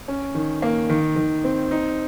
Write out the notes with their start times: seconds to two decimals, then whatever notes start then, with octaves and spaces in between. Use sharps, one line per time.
0.08 C#4
0.35 D#3
0.62 A#3
0.89 D#3
1.16 D#3
1.44 C4
1.71 D#4